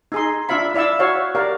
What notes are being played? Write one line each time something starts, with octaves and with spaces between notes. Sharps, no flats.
D#4 G#4 C6
D4 F4 E5 F5 B5
E4 D5 E5 F5 E6
F#4 C#5 F5
G4 A#4 D5 F5